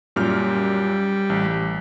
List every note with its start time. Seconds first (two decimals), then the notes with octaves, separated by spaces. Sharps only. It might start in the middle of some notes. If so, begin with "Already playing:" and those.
0.16 F#2 A#2 G3 F6
1.30 A1